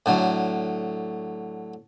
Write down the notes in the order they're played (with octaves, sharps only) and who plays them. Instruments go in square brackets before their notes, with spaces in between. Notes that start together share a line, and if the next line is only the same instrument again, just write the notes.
[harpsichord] A2 D3 F#3